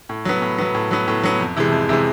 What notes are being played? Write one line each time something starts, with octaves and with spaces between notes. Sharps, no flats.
A2
F#3 B3
A2
F#3 B3
A2
F#3 B3
A2
F#3 B3
F2
C3 E3 G#3
F2
C3 E3 G#3